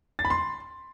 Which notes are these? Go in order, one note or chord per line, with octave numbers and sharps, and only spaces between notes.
A6
B5
C6